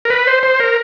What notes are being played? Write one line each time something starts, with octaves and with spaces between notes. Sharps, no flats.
A#4
B4
C5
C5
A#4